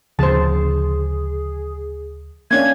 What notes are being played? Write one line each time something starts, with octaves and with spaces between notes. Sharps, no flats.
D2 C#3 F3 G#4 C5 A5
A#3 C#4 D4 G#6